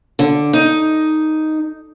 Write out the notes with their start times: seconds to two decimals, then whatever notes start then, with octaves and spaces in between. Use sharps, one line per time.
0.19 D3
0.53 D#4